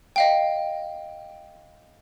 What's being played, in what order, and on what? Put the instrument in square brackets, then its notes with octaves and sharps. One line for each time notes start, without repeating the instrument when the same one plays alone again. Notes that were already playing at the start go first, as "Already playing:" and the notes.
[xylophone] D#5 F5 G5